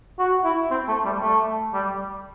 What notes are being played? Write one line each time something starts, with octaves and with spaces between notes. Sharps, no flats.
F#4
E4
C4
A3
G3
A3
G3